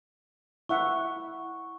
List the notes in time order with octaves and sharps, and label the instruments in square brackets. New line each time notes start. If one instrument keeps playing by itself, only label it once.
[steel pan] E4 E5 F#5 [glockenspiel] C#6